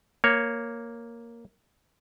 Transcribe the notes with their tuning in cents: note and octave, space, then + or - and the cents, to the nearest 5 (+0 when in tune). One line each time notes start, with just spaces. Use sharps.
A#3 +0 C#5 +0